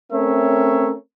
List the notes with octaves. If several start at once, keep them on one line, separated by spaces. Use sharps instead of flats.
A3 C4 C#4 A#4 C#5 E5